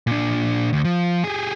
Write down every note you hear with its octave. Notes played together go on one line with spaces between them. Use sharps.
A#2 D4
D2
F3
G4 G#4